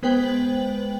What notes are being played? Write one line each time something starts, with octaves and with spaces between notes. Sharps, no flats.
G#3 B3 B4 C5 G5 F#7